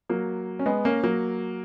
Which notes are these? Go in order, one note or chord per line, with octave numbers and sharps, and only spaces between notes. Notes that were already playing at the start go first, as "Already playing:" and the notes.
F#3 A#3
C#4
G#3 B3
A#3 C#4
F#3 A#3